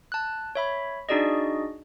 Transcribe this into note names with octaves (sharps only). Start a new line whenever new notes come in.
A5 F#6
C#5 E5 B5
D4 D#4 F#4 G#4 D5 D#5